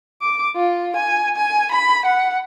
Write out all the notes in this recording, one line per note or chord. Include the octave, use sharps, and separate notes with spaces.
D6
F4
G#5
G#5
B5
F#5